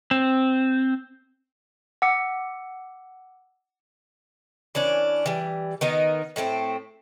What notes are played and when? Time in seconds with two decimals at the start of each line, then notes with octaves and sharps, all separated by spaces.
0.11 C4
2.02 F#5 D6 E6 C#7
4.75 E3 C#4 D4 D5
5.26 E3 G3
5.81 D#3 B3 D#4 A#4
6.36 A2 A3 B3 C4